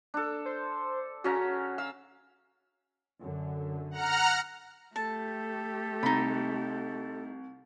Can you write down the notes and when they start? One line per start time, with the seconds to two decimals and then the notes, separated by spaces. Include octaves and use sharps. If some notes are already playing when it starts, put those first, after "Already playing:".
0.14 D4 A4
0.46 C5
1.24 C#3 C#4 F#4 A#5
1.78 F5 E6
3.21 F#2 D3
3.91 F#5 A#5 F6
4.96 A3 G4 A4 A5
6.03 C2 D#4 B5